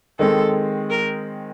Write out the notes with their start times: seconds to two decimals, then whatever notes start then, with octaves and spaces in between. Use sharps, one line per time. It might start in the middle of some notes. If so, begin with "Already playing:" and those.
0.19 D#3 G#3 C4 A4
0.90 A#4